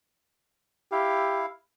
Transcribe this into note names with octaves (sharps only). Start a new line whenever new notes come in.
E4 G4 F5